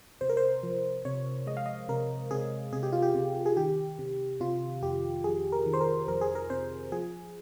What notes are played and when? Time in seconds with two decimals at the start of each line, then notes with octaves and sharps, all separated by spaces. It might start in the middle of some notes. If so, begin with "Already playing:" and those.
0.21 C3 C5
0.29 A#4
0.37 C5
0.63 F3
1.05 C3 C#5
1.47 G#3 D#5
1.57 F5
1.66 D#5
1.89 C3 A#4
2.31 C3 G#4
2.73 C3 G#4
2.83 G4
2.92 F4
3.02 G4
3.15 C3
3.46 G#4
3.57 D#3 G4
3.99 C3
4.40 C3 F4
4.82 F2 G4
5.24 F2 G#4
5.52 A#4
5.66 D#3
5.73 C5
5.80 A#4
6.08 F2 A#4
6.21 G#4
6.35 A#4
6.50 C3 C5
6.92 F3 G#4